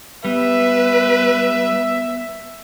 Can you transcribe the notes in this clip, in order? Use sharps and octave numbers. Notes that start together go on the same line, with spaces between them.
G3 B3 B4 E5